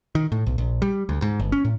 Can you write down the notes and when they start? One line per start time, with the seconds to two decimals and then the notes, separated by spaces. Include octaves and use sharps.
0.15 D#3
0.32 A2
0.47 B1
0.58 A#1
0.82 G3
1.09 D2
1.22 G#2
1.40 G1
1.52 C#4
1.65 A2